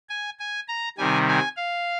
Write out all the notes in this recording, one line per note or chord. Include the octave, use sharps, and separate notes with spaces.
G#5
G#5
A#5
C3 D#3 G3 G#5
G#5
F5